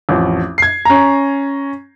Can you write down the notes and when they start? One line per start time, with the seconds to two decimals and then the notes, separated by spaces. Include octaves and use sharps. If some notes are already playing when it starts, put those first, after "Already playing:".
0.09 A1 F2
0.58 G#6 C7
0.85 C#4 A#5